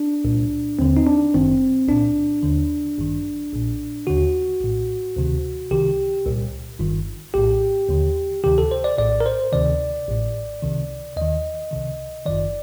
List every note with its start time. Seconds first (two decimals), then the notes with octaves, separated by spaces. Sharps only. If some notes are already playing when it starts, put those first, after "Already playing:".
Already playing: D4
0.24 C2 A#2
0.79 D#2 D3 C4
0.97 D#4
1.07 D4
1.34 G1 F#2 D#3 C4
1.88 C2 A#2 D4
2.43 D#2 D3
2.98 A1 G2 D#3
3.53 A#1 A#2
4.07 D#2 D3 F#4
4.61 A#1 A2
5.16 D2 C3 D#3
5.71 C2 C3 D#3 G4
6.26 C2 A#2
6.79 G1 G2 D#3
7.34 A#1 A2 G4
7.89 D#2 D3
8.44 D2 C3 D#3 G4
8.58 A4
8.71 C5
8.84 D5
8.98 A#1 A2 D5
9.21 A#4
9.26 C5
9.52 D2 C3 D#3 D5
10.08 A1 A2
10.62 C2 C3 D#3
11.16 D#2 D#3 D#5
11.71 C2 C3 D#3
12.26 G1 F#2 D#3 D5